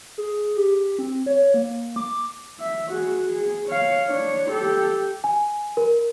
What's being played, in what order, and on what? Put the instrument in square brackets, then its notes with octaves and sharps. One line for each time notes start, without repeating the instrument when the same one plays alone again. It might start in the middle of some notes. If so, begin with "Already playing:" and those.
[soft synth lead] G#4
G4
C4
C#5
A#3
D6
[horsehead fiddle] E5
F#4 G#4
G#4
C#5 F5
D4 C#5
G4 A4
[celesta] G#5
A#4